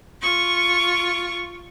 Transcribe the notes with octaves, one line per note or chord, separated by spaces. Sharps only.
F4 C#6